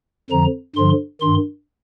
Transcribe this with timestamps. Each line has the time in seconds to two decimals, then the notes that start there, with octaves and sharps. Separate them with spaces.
0.30 F2 D3 F3 A#5
0.76 G2 D3 F3 C6
1.21 G2 D#3 C6